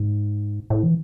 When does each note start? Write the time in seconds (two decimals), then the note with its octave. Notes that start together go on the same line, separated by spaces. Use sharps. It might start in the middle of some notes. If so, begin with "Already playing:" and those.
Already playing: G#2
0.70 A2
0.83 E3